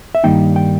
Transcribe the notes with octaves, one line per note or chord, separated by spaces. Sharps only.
E5
G2 D#3 G3 A#3 D#4 G5
G5